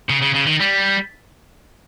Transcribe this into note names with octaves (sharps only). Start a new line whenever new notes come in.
C#3
C#3
C#3
D#3
G3